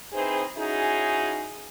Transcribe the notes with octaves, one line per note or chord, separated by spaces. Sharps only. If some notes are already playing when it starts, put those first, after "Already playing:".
C4 D#4 E4 G#4 B4 C5
C#4 D#4 E4 F#4 G#4